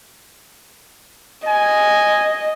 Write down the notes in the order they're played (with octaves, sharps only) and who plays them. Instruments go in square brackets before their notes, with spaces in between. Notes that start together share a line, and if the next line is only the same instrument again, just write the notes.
[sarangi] D#5 [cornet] G#5